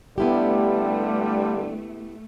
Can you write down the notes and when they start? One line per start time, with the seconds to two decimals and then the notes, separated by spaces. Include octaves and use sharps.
0.18 G2 D3 G3 A3 B3 E4 G4